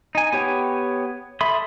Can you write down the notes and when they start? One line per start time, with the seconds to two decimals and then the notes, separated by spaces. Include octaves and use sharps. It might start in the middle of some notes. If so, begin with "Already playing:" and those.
0.15 D#4 G#5
0.33 B3 G4 C#5 G5
1.41 A4 E5 B5 C6 D#6